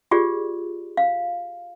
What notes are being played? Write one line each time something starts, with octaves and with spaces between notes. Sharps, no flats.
F4 G4 G#4 D5
F5